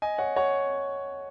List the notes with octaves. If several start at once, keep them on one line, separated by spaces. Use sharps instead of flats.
D#5 G#5
C#5 F#5
C#5 F#5